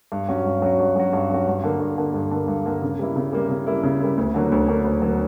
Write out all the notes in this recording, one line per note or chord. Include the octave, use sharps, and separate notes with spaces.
G2
F#3 C#4 F#4
G2
F#3 C#4 F#4
G2
F#3 C#4 F#4
G2
F#3 C#4 F#4
G2
D3 A#3
G2
D3 A#3
G2
D3 A#3
G2
D3 A#3
C#3
G3 A#3 E4
C#3
G3 A#3 E4
C#3
G3 A#3 E4
C#3
G3 A#3 E4
D2
D3 F#3 A#3
D2
D3 F#3 A#3
D2
D3 F#3 A#3